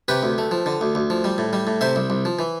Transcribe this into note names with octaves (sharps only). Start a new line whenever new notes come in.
C3 G4 B4
D2
A3
F3
D3
D2
D2
F3
G3
A2
G3
A2
C3 C5 E5
C2
C2
F3
E3